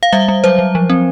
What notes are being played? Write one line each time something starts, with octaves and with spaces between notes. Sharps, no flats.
F5
G3 E5
G3
F#3 C5
F#3
F3
C4